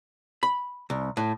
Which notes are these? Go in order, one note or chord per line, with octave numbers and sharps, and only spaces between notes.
B5
C2
A2